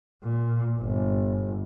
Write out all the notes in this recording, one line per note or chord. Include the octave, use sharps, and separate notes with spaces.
A#2
G1